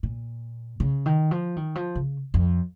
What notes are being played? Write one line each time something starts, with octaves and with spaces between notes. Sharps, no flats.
A#2
C#3
D#3
F3
D#3
F3
C#3
F2